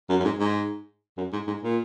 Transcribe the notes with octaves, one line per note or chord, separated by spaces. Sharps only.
F#2
F#2
G#2
G#2
F#2
G#2
G#2
A#2